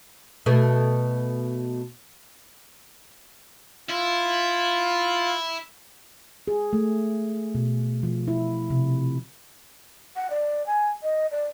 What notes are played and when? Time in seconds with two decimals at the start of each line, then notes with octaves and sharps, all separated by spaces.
0.46 B2 A3
3.90 E4 F4
6.48 G#4
6.73 A3
7.55 B2
8.03 F3
8.28 E4
8.70 C3
10.16 F#5
10.30 D5
10.67 G#5
11.03 D#5
11.31 D5